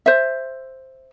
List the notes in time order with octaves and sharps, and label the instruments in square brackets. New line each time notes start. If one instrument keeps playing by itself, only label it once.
[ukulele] C5 E5